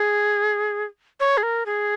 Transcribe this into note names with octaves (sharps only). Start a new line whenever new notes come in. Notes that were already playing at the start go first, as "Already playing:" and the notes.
Already playing: G#4
C#5
G#4
A#4
G#4